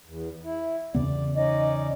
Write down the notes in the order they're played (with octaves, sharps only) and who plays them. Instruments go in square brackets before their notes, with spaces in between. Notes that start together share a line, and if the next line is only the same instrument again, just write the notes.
[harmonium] E2
E4
[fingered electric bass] E2 C#3 B3 [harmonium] D5
[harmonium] C#4 D#4 D5 [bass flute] D#5